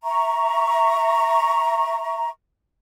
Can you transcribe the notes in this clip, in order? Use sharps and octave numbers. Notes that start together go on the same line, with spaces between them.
E5 A#5 C#6